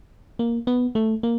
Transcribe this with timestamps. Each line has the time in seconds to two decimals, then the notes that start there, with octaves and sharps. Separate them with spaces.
0.39 A#3
0.67 B3
0.95 A3
1.23 A#3